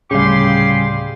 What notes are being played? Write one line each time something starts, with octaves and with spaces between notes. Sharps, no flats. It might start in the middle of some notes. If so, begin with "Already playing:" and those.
D2 A2 C#3 G3 G4 G#4 F5 C6